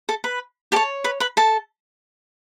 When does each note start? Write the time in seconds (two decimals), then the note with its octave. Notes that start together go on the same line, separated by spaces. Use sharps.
0.09 A4 A5
0.24 B4 B5
0.72 G4 A4 C#5 A5
1.04 B4 B5
1.20 B4 B5
1.37 A4 A5